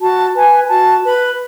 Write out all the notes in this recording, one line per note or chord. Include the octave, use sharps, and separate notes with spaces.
F#4 A5
B4 G#5
F#4 A5
B4 B5